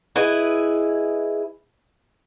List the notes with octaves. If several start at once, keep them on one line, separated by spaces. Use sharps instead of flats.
E4 G#4 B4 D#5